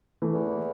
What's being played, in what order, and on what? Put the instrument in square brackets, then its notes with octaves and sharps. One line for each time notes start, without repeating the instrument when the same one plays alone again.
[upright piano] E3 A3
[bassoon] E2